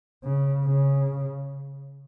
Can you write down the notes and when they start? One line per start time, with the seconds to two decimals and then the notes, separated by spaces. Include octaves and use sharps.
0.24 C#3
0.66 C#3